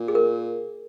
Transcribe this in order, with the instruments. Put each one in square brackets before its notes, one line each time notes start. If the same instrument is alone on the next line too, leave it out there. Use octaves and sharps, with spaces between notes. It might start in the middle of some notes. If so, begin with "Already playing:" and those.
Already playing: [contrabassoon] A#2
[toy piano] G#4
A#4